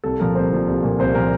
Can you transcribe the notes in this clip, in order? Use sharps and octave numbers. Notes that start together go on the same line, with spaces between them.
C2 A4
A#2 F3 A#4
C2 C5
A#2 F3
C2
A#2 F3
C2 C5
A#2 F3 A#4